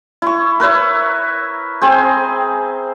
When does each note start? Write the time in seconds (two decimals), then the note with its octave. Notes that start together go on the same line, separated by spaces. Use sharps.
0.22 E4 C#6
0.60 A#4 B4 C#5 E5
1.81 C4 G#4 C5